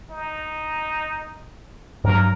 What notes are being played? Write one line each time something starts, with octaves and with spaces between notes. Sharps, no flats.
D#4
G2 F#3 A#4